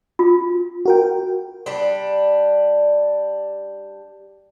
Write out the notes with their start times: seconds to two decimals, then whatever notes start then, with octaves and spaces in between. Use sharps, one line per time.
0.19 F4
0.85 F#4 A#4 G5
1.66 G3 D4